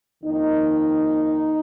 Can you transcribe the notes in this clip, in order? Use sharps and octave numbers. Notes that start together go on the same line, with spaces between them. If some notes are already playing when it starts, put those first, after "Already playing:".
F2 D#3 A#3 D#4